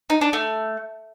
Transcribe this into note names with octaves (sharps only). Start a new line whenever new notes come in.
D#4
D4
A3